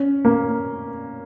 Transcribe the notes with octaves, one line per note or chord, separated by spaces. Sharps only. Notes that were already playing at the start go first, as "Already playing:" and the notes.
Already playing: C#4
A#3